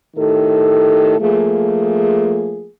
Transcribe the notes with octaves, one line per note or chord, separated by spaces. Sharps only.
A2 D#3 G4 A4
F3 A3 A#3 G#4